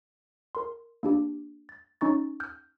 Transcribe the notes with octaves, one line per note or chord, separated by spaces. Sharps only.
A#4 C6
A#3 D4 G4
A6
C#4 D#4 C#6 A6
F6 G6